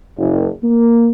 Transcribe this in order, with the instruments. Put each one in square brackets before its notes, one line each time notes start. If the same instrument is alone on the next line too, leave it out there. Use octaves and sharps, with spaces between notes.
[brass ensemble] F#1
A#3